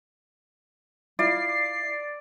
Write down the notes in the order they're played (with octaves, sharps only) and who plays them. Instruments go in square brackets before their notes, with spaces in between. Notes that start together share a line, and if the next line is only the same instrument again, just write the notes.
[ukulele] E4 F4 [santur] D5 [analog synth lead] C7